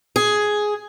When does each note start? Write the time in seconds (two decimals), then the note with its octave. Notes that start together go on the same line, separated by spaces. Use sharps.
0.16 G#4